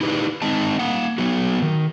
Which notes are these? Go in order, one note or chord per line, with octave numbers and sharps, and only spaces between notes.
D#4 E4 G4 B4 D5
D#3 G#3 C4 D#4 D#5 A5
A#3 F#5
F#3 B3 F#4
D#3